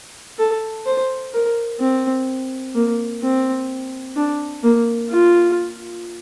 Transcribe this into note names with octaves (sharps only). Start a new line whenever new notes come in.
A4
C5
A#4
C4
A#3
C4
D4
A#3
F4